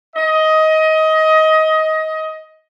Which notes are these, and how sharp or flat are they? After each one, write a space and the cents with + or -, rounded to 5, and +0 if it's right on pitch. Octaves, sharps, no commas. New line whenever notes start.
D#5 +20